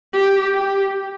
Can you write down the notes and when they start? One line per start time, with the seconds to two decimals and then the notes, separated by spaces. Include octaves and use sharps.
0.13 G4
0.54 G4